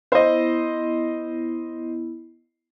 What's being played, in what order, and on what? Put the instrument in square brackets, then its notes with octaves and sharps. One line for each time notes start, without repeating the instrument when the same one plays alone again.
[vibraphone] B3 E4 [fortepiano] C5 D#5